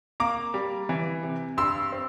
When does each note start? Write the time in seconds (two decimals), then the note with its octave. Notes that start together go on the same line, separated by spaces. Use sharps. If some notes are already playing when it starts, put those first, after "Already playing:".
0.20 A#3 A#5 D6
0.54 G3
0.89 E3
1.23 C3
1.57 G2 C6 E6
1.92 C4